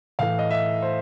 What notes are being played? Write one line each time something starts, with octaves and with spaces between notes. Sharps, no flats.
A2 E3 A3 F5
D#5
E5
C5